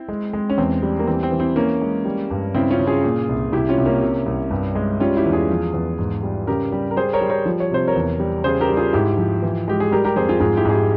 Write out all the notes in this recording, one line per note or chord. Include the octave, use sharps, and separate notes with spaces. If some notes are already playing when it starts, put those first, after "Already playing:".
Already playing: C4 E4
G#3
G#3
C#4
E2 C4
G3
A#3
E3 C4
C4
E3
C4 E4
E3 A#3 C#4
G#3
G3
G2
C#3 C4 E4
C#4 F4
C#3
F4 G#4
A#2
C2
C2 E4 G4
C#4 F4
C2
A#3 C#4
C3
C2
G2
G#3
G3 C#4 F4
E4 G4
E2
F4 G#4
F3
E2
G#2
G3
C#3 G4 A#4
G3
A#4
G3 G#4 C5
A#4 C#5
G3
A#4 C#5
F3
C#5
C3 C5
A#4 C#5
E2
G3
C#3 G#4 C5
G4 A#4
G3
F4 G#4
G#2 E4 G4
F3
E3
G#3 G4
G#4
G3 G4 A#4
G4 A#4
F2 G#4 C5
F4 G#4
G#2 F4 G#4
E4 G4
G#2 G#4
E4 G4